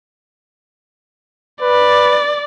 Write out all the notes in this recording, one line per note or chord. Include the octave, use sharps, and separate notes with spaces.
B4 D5